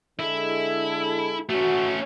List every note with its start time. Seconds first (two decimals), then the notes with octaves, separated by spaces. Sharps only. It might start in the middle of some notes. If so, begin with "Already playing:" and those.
0.19 D3 G#3 E4 A4
1.49 A3 C#4 F#4